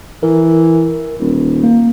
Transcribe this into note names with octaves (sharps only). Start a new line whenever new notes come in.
E3 A#4
D#1
A#3